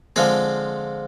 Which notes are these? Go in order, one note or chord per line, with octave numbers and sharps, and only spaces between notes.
D3 F3 G#3 C4 G#4